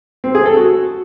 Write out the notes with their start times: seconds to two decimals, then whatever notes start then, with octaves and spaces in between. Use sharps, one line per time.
0.24 C4
0.35 G#4
0.46 A4
0.57 F#4